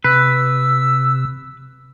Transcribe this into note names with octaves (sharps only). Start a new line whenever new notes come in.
C3 B4 E6